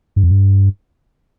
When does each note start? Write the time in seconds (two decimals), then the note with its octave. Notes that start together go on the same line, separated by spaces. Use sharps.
0.16 G2
0.24 F2
0.31 G2